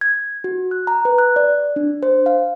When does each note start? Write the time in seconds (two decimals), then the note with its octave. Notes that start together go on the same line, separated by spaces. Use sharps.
0.01 G#6
0.44 F#4
0.71 F#6
0.87 A#5
1.05 B4
1.18 F#6
1.36 D5
1.76 D4
2.03 C5
2.26 F5